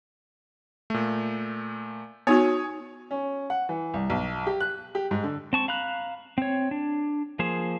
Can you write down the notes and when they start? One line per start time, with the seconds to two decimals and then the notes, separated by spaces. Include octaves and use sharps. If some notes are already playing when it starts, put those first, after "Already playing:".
0.90 A#2 A3
2.27 B3 D#4 F#4 C#5 G#5 D#6
3.11 C#4
3.50 F#5
3.69 E3
3.94 C2
4.10 B1
4.47 G4
4.60 F#6
4.95 G4
5.11 G#2
5.23 D3
5.53 C4 A5 C#6
5.68 F5 A#5 B5 F#6
6.38 C4 C#5
6.71 D4
7.39 F3 A#3 G#4 C5